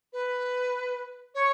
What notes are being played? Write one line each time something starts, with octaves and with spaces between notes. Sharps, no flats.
B4
C#5